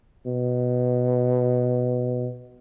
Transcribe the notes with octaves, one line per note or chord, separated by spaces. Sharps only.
B2